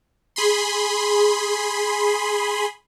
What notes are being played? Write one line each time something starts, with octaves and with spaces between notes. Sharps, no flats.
G#4 B5 C6